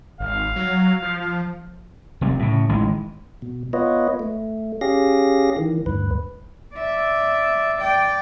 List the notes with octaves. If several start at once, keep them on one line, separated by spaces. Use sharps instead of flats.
G#1 F5
F#3
F3
F1 C3 G3
A2 C#3
A1 D#3 E3 G#3
B2
B3 F4 B4 C#5 D#5
A3
C#4 G4 G#4 F5 A#6
D#3 E3
D2 G2 B4
D5 E5
D5 G5